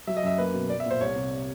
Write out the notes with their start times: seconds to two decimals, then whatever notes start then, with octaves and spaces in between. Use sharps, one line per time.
0.07 F#3 E5
0.17 D#5
0.23 F#2 E5
0.38 A#3 B4
0.54 B2
0.70 B3 D5
0.80 E5
0.86 A#2 C5
1.01 C2 C#5
1.16 C3